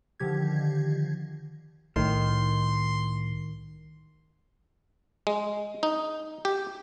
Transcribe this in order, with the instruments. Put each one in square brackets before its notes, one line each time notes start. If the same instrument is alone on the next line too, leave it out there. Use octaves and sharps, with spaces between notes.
[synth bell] D3 D#3 F3 G4 G#6
[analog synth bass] C2 [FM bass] A2 [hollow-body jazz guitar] D#3 [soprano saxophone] C6
[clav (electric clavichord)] G#3
D#4
G4